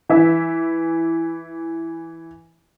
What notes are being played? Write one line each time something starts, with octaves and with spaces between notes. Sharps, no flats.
E3 E5